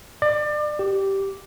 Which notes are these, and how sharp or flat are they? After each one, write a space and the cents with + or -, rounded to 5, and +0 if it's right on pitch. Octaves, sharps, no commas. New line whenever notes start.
D5 +30
G4 -10